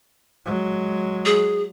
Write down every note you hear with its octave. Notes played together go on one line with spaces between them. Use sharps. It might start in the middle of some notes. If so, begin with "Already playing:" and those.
F#3 G#3
G#4